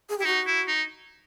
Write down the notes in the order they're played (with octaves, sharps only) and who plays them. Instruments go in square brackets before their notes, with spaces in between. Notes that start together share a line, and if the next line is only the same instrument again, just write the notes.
[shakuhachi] G#4
[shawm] E4 [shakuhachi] G4
[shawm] D#4 [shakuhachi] F#4
[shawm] E4
D#4